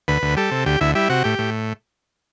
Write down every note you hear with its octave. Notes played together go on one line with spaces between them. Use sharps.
D2 B4
D2
G3 A4
C3
D2 G4
D2 E4
G3 E4
C3 F#4
A2 G4
A2